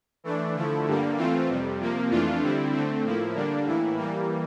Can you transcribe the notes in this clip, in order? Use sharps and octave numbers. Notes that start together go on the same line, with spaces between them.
E3 A3 D4
D3 F3 A3 E4
G2 D3 G3 A#3
E3 A3 C4 F4
F2 C3 G3
C3 F3 A#3
F2 E3 A3 D4 F4
D3 G3 C4 E4
D3 A3 C4
A2 F3 A#3 E4
D3 G3 A#3 D4
A2 E3 A#3 E4
E3 G3 A#3